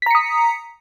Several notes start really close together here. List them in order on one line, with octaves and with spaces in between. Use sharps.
B6 A#5 C#7 D#6